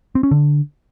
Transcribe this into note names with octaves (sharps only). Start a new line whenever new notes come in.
C4
C#4
D3